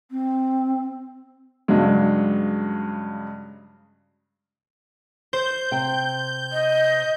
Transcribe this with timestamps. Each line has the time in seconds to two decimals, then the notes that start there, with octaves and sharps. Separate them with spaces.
0.11 C4
1.68 G2 C#3 F#3 G#3
5.33 C5 G6
5.71 C3 G5
6.52 D#5